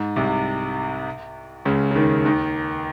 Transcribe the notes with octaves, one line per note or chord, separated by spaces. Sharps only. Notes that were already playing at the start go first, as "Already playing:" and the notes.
Already playing: G#2
C2 C3
C#2 C#3
C#3
D#2 D#3
D#2 D#3